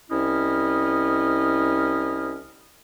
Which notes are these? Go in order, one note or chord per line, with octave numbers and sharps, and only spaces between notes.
C2 C#4 E4 D#5 F6